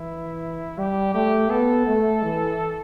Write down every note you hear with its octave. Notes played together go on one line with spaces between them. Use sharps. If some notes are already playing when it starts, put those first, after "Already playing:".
Already playing: E3 E4
G3 G4
A3 G4
B3 A4
A3
E3